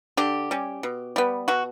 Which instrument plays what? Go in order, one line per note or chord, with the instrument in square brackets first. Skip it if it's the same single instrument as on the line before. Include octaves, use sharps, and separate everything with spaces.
[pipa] D3 G4
G3 C#4
B2
G3 B3
B2 F#4